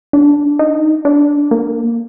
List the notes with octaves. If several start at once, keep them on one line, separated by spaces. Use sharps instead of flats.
D4
D#4
D4
A#3